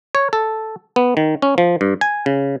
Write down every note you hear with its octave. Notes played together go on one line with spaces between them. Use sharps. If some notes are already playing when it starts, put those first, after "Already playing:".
C#5
A4
B3
D#3
C#4
F3
G2
G#5
C#3